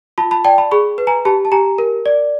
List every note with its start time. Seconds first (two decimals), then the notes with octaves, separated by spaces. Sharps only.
0.18 F4 A5 B5
0.31 A5 B5
0.44 D5 G5 A5
0.58 A5 B5
0.71 G#4 B5 C#6
0.98 B4
1.07 G#5 A#5
1.25 G4 A5 B5
1.45 A5
1.52 G4 G#5 A#5
1.78 A#4
2.06 D5